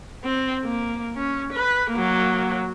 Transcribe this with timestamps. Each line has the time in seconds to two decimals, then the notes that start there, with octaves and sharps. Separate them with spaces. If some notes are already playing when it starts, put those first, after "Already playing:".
0.24 C4
0.64 A#3
1.16 C#4
1.53 B4
1.91 F#3 A#3